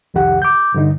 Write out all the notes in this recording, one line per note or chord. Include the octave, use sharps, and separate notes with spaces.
C2 F2 D#3 G4 F#5
D6 G6
G2 D3 D#4